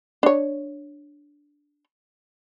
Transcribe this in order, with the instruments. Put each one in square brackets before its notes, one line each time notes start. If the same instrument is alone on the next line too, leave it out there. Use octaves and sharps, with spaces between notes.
[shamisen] D4 C#5